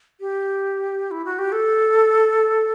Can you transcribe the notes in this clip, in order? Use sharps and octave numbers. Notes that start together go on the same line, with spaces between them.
G4
E4
F#4
G4
A4